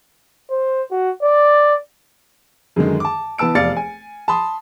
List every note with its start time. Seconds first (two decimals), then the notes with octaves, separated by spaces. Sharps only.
0.51 C5
0.91 F#4
1.23 D5
2.76 F#2 D3 D#3 G#3
3.00 A5 D6
3.38 E3 B3 A5 E6 D7
3.55 F1 E2 D5 F5 A6 C#7
3.76 G#5
4.28 A5 B5 C6 D#6